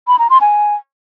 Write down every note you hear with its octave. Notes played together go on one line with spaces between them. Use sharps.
B5
A#5
C6
G#5